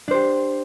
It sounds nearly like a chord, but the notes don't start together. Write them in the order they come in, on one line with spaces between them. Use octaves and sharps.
D4 C5 G4